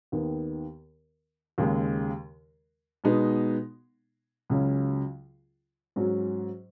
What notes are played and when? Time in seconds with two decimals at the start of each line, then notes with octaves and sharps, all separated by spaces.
0.12 D#2 D#3 B3
1.58 D#2 C#3 G#3
3.04 B2 G#3 B3 D#4
4.50 C#2 C#3 F#3 C#4 F#4
5.96 G#2 F#3 C#4 F#4